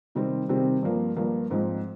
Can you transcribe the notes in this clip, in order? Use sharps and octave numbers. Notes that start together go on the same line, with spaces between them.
C3 D#3 G3 C4
C3 D#3 G3 C4
G2 F3 A#3
G2 F3 A#3
G#2 F3 C4 D#4